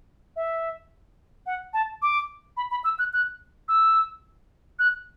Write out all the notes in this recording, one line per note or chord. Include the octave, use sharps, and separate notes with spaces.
E5
F#5
A5
D6
B5
B5
E6
F#6
F#6
E6
F#6